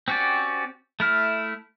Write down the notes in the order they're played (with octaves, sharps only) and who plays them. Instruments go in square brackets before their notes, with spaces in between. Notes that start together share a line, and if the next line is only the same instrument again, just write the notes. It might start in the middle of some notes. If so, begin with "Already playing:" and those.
[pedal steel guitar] C4 C#4 F#4 G4 D5
A3 E4 F6